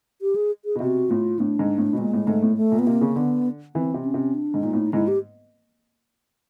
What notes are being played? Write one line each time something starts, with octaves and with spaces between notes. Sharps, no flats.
G4
G#4
G#4
B2
C3 F#4
A2 F4
A2 D4
G#2
A2
B2
A#2 G#3
A2
G#2 A3
A2
A3
A#2
B3
C3 A#3
C#3
D3 B3
E3 C4
C3
C#4
C3
D4
G#2
A#2 D#4
A2
G#2 E4
G4